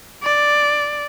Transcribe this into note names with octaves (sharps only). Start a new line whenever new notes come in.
D5